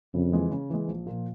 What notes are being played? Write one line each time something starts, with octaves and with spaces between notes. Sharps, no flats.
F2 C#3
E3 G#3
C#3
E3 G#3
A#1
A#2 F3